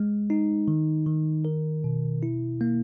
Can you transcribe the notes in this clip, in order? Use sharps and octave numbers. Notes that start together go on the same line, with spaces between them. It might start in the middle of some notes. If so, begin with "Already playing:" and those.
Already playing: G#3
D#4
D#3
D#3
A#4
B2
E4
A#3